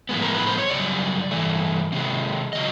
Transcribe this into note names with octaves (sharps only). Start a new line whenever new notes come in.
A2 F3 G#3 B3
A#4
B4
C5
C#5
F#2 C#3 G3 D5
G2 E3 A3
C3 D#3 G#3
C#3 F#3 D#5